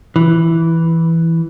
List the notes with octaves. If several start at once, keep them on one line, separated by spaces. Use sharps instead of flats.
E3